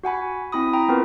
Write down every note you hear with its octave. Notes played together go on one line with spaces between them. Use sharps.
F#4 F#5 G#5 B5
C4 E4 B5 D#6
G5 A#5 B5
B3 C4 F4 A#4 B4